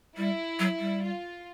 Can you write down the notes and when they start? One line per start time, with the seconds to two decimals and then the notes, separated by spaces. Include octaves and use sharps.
0.17 G3 E4
0.59 F#3
0.79 G3
1.01 F4